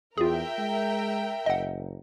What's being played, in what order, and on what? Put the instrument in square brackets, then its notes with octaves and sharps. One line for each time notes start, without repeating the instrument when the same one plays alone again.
[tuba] E2 [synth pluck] F4 G#4 [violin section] A#4 E5 G5
[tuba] G#3
[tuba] F#1 [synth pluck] D#5 F#5